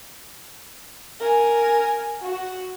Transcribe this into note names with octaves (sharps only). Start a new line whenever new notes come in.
A#4 G#5
F#4